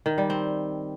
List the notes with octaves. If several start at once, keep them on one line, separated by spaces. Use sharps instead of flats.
D#3
G3
C4